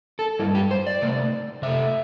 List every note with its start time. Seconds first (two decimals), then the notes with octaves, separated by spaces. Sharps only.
0.19 A4
0.39 G2 G3 E4
0.55 G4
0.71 C5
0.87 D5
1.02 C3 A3
1.62 C3 A3 E5